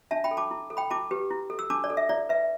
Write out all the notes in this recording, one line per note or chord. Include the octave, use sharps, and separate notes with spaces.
D4 E5 A5
G5 B5
A4
A5 D6
E4
A4
G5 B5
E4 A5 D6
G4 B4
E4
A4
E6
D4 A5 D6
D5
A4
E5
E4 D5
B4 E5